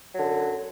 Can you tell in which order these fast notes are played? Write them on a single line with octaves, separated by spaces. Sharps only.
F#3 D3 F#2